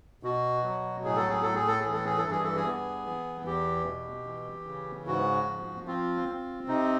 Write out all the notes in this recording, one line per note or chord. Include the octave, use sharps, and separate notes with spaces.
B2 F#4
F#3
A2 G#4
A4
G#4
A2 A4
G#4
A4
E3 G#4
A4
G#4
A4
G2
G#4
A4
G#4
B3
E3
E2 G4
B2
E3
C#3
G#2 F#4
F3
C4 F4
C4
C3 D#4